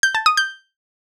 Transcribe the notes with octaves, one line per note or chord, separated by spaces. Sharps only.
G6
A5
D#6
G6